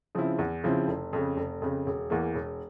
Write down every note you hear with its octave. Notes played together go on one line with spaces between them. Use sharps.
C#3 F3 C4 E4
E2
C#3 F3 C4 E4
F1
F2 C#3
F1
F2 C#3
E1
E2 E3 A#3
E1